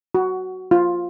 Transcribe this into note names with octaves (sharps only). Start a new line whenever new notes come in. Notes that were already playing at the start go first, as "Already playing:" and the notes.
F#4
F4